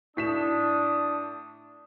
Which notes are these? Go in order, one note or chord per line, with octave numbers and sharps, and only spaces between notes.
A2 D4 D#6 B6 E7